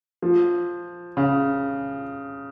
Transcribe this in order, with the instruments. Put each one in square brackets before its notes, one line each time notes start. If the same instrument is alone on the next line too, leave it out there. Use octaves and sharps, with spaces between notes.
[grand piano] F3
C#3